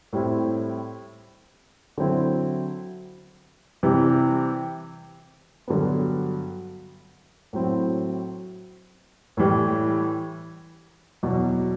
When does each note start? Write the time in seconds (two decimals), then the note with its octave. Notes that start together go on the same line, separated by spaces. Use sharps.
0.13 A2 G3 C4 E4
1.98 D3 F#3 C4 E4
3.83 C3 E3 G3
5.68 G2 D3 F#3 B3
7.53 A2 F#3 C4 E4
9.37 A2 E3 G3
11.23 E2 B2 F#3